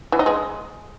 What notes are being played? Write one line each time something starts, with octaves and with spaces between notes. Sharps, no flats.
E3
D#4
G#3